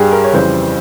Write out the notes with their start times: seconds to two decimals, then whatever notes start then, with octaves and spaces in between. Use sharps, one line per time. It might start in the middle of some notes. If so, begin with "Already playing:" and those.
Already playing: G2 G3 G4 G#4
0.12 A#4
0.24 C#5
0.33 F2 C#3 E3 G3 C5